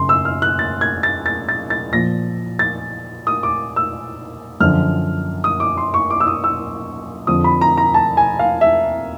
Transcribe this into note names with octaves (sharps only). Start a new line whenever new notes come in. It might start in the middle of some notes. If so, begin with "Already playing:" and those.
Already playing: F#2 C#3 C6
E6
F6
F#6
A6
G#6
A6
A6
A6
A6
A#2 F3 A#6
A6
D#6
D6
E6
F#2 D3 F3 F6
D#6
D6
C6
C#6
D6
E6
D#6
E6
F2 D3 F3 D#6
B5
A#5
A#5
A5
G#5
F5
E5